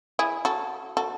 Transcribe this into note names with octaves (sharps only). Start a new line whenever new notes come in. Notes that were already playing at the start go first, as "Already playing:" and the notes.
E4 G#4
F#4 A4
F#4 A4